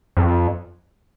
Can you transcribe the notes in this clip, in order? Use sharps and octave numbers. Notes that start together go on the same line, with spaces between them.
F2